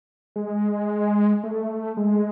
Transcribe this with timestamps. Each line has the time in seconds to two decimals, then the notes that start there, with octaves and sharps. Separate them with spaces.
0.36 G#3
1.44 A3
1.97 G#3